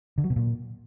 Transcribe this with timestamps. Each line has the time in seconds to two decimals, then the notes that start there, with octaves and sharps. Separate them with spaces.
0.18 D3
0.24 F#3
0.30 B2
0.36 A#2